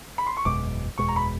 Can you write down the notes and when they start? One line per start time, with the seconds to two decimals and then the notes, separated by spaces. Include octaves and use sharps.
0.18 B5
0.27 C6
0.37 C#6
0.45 F#1 E2 B2 G#3 D6
0.98 F#1 E2 B2 G#3 C#6
1.08 A#5
1.16 B5